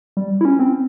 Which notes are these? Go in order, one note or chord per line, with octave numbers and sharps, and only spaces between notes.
G3
E4
C#4
C4